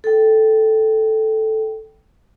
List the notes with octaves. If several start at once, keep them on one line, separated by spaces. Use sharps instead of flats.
A4 G5